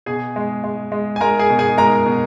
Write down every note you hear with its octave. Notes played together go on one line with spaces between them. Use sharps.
B2 G#4 G#5
G#3
G#3
G#3
G#5
G#3 A#4 A#5
G#4 G#5
B2
G#4 G#5
G#3 A#4 A#5
B2